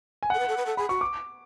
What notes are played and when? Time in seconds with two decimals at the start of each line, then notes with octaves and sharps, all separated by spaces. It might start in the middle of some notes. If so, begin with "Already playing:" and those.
0.23 G#5
0.30 A4 F#5
0.39 B4
0.48 A4
0.57 B4
0.66 A4
0.77 G#4 B5
0.89 F#4 C#6
1.01 D6